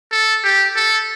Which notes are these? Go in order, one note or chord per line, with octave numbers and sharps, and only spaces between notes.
A4
G4
A4